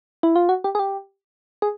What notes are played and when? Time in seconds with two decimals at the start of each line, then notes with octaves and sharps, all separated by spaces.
0.23 E4
0.36 F4
0.49 F#4
0.64 G4
0.75 G#4
0.79 G4
1.62 G#4